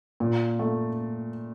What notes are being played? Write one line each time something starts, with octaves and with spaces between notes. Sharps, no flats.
A#2
A3